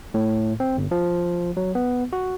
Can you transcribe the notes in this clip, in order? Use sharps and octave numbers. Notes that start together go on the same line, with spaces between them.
A2
C4
G1
F3
F#3
B3
F#4